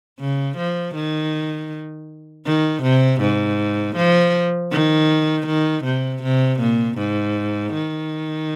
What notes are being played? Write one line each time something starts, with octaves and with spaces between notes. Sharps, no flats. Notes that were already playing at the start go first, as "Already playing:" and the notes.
C#3
F3
D#3
D#3
C3
G#2
F3
D#3
D#3
C3
C3
A#2
G#2
D#3